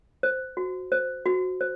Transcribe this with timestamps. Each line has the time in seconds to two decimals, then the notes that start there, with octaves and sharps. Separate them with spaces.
0.23 C5
0.57 F#4
0.92 C5
1.26 F#4
1.61 C5